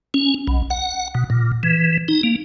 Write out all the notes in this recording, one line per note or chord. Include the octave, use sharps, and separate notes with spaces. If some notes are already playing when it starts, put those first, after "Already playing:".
C#4
B1
F#5
B2
A#2
E3
D#4
A#3